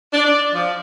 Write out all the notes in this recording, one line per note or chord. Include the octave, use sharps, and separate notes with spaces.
D4
D5
F3